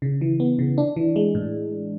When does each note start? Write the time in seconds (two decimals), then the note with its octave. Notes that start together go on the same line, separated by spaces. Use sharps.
0.02 C#3
0.21 E3
0.40 B3
0.59 C#3
0.78 D4
0.96 E3
1.16 G#3
1.35 A2